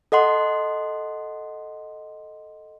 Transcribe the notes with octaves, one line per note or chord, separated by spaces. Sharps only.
A4 D#5 F#5 C6